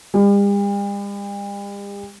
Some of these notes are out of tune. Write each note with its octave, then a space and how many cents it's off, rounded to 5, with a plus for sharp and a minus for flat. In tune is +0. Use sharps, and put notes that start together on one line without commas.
G3 +45